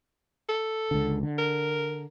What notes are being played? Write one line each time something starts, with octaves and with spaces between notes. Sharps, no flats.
A4
C#2 D3
D3
A#4